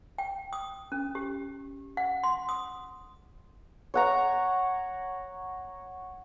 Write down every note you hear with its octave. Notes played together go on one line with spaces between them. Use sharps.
G5
D#6
C#4
G4
F#5
C6
D#6
C#5 F#5 A#5